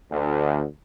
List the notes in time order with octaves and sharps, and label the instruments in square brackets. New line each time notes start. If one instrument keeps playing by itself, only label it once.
[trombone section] D2